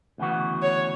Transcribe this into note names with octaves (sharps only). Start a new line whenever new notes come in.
D2 C#3 E3 B3 F#4
C#5